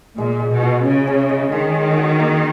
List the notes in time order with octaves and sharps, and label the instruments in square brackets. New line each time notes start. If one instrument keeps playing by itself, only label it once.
[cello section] A#2 [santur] G#3
[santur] G#3
[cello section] B2
[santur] F4
[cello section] C#3 [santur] C#4
[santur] C#4
D#5
[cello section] D#3 [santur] G#3
[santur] G#3
F#4
A#3